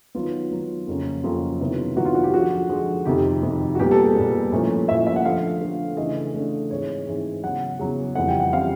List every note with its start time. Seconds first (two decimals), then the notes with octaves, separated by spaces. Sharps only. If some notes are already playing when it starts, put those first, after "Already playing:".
0.15 D#3 F#3 B3 F4
0.51 D#3 F#3 B3
0.87 F2 C#3 F#3 A#3 C#4
1.23 F2 C#3 F#3 A#3 C#4 F4
1.60 C3 D#3 F#3 B3 E4
1.97 C3 D#3 F#3 B3 E4 F#4
2.05 F4
2.15 F#4
2.23 G4
2.33 D3 F3 G#3 F#4
2.69 D3 F3 G#3
3.05 F2 C3 D#3 G4
3.43 F2 C3 D#3
3.75 F#4
3.79 A#2 G3 B3 G4
3.91 A4
4.04 G#4
4.15 A#2 G3 B3 B4
4.52 A#2 F3 A3 C#4 E4
4.88 A#2 F3 A3 C#4 E4 E5
5.07 E5
5.16 F#5
5.24 D3 F3 A3 F5
5.61 D3 F3 A3
5.97 C#3 E3 A3 D4 D#5
6.34 C#3 E3 A3 D4
6.71 G#2 E3 G#3 C4 C#5
7.06 G#2 E3 G#3 C4
7.43 E2 C#3 F#3 F#5
7.79 E2 C#3 F#3
8.15 F2 C#3 E3 G3 C4 F#5
8.28 G5
8.40 F#5
8.53 C#3 E3 G3 C4 F5